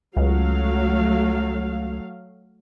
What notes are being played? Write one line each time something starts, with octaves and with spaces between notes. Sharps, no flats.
C#2 F#3 A3 F5